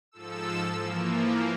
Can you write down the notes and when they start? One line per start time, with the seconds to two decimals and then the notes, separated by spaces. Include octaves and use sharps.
0.12 G#2 F3 A4 E6
0.76 E3 F3 A#3